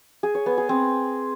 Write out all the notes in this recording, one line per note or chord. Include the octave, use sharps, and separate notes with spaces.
G#4
C#5
B3
G#4
C4